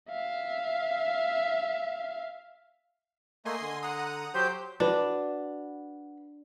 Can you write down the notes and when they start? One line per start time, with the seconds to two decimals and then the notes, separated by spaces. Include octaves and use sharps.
0.10 E5 F5
3.45 A3 A#3 D#5 G#5 C6
3.61 D3
3.83 F#5 A#5 D#6
4.34 F#3 G4 C5 G6
4.80 D4 F#4 B4